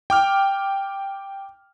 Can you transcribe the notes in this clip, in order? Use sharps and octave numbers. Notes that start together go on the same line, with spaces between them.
G5 D6 F6